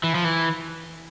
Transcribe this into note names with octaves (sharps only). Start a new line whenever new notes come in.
E3
F3
E3